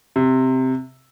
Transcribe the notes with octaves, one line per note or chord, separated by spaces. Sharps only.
C3